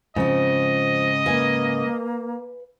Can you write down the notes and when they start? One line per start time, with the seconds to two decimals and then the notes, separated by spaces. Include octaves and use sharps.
0.16 G#2 C#3 F3 C4 D#5
1.26 A#3 B4 F5 G#5